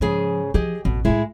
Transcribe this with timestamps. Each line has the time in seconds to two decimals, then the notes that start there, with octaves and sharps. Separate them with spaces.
0.01 G#2 C#3 F3 G#4
0.54 E3 F3 G4 G#4 D#5
0.85 A1 F2 B2
1.05 A2 G#3 E4 F4